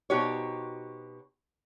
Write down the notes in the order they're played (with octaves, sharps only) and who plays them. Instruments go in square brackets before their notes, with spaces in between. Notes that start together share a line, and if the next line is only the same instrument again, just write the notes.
[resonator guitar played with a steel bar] B2 D#4 F#4 G4 C5 C#5